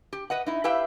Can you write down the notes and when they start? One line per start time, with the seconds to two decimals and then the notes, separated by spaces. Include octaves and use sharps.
0.13 G4
0.30 B4 D#5 F#5
0.47 D#4 E4
0.64 E4 G4 B4 E5 F5 G5